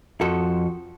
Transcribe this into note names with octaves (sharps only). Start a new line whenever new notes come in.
F2 F3 F#4 A4